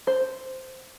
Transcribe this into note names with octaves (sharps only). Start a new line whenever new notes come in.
C5